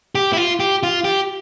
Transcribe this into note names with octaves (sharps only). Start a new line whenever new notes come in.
G4
E4
F4
G4
F4
G4